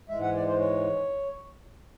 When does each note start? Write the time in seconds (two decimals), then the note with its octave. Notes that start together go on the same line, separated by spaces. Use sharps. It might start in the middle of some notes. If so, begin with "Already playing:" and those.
0.09 G#2 E3 G#3 E5
0.22 F#5
0.35 D5
0.47 C5
0.59 C#5